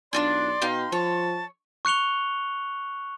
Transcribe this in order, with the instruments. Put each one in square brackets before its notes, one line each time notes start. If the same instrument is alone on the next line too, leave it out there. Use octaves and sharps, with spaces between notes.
[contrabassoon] B1 [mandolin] D4 F4 G#4 [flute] D5 [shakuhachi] C6
[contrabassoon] B2 [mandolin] D#4 F5 G5
[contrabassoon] F3 [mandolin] C#5 [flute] A5
[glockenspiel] C#6 F#6 C#7 F7 G7